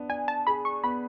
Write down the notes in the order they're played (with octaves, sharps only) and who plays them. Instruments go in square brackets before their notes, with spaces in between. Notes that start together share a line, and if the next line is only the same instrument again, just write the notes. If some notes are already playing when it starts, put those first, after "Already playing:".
Already playing: [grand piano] B3 D4
[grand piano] D5 [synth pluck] G#5
[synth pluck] A5
[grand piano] G#4 [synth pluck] B5
[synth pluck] C#6
[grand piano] B3 [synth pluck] B5